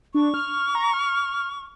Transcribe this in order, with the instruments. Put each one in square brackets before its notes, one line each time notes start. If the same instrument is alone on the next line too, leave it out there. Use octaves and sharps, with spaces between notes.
[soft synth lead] D4 [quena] C#6
[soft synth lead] F6
A#5
F6